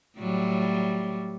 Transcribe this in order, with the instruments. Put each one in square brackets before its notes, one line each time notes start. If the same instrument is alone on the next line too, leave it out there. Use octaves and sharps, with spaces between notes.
[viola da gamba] A2 F#3 G3